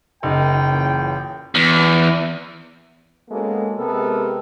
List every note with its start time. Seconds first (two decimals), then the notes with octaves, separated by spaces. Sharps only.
0.23 F#1 D#4 A#4 G5
0.68 A#2 C#3 E3
1.55 E2
3.29 G#3 A#3 B3 C#4 F#4 A4
3.76 C3 G#3 B3 G4 A4 A#4